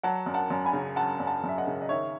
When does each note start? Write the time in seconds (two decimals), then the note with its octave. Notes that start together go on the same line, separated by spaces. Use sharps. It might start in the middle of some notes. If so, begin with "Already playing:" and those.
0.03 F#3 F#5 A5
0.26 F#2
0.34 F#5 A5
0.50 F#2
0.65 G#5 B5
0.73 C#3
0.96 F#3 F#5 A5
1.20 F#2
1.27 F#5 A5
1.44 F#2
1.49 E5
1.58 D#5 F#5
1.67 C#3
1.82 D#5
1.89 D#3 C#5 E5